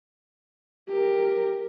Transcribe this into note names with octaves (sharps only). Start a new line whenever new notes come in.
G4 A#4